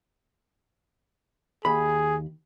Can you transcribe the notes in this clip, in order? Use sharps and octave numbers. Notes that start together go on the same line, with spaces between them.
D#2 G#4 B5